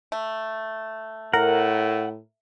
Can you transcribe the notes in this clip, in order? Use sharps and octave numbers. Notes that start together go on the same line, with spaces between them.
A3
A2 A#4 F#5